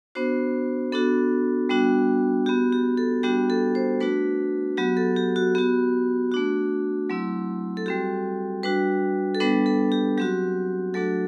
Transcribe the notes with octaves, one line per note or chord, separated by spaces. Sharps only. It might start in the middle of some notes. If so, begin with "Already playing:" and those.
B3 D4 F#4 C5
B3 D4 F#4 A4
G3 B3 D4 F#4
B3 F#4 G4
G4
A4
G3 B3 D4 F#4 G4
A4
C5
A3 D4 F#4 B4
F#3 B3 F#4 G4
A4
G4
F#4
B3 F#4 G4
A3 D4 F#4
F#3 A3 C4 E4
A4
G3 C4 F#4 G4
G3 D4 F#4 B4
A4
G3 B3 D4 B4
A4
G4
F#3 C4 F#4 G4
F#3 A3 D4 F#4 A4